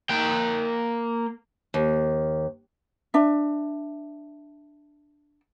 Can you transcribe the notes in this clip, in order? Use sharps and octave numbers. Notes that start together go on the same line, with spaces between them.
A#3 G5
D#2
D4 E5